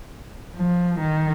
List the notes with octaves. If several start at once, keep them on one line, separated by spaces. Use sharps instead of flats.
F3
D#3